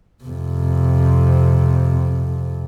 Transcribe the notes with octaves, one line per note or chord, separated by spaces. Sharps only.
F2 C3